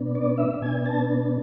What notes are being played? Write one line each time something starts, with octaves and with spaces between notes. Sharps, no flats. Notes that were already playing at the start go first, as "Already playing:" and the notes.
Already playing: B2 B3 D4
D5
E5
B2 B3 D4 G#5
A5